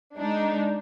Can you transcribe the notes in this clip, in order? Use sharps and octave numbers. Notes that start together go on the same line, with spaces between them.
G#3 D4 D#4